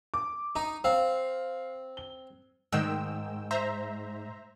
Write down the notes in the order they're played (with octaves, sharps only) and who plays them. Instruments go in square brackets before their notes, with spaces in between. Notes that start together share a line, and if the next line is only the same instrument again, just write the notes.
[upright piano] D6
[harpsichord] D#4 [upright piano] A#5
[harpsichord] C4 [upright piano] F5
[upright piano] G7
[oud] G#2 [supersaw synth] D#3 G5 E6
[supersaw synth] C5 E5 A#5